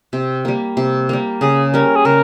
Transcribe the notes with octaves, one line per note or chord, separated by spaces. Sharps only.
C3
G3 A#3
C3
G3 A#3
C#3 G#4
G3 C#4 A#4
G#4
C#3 A#4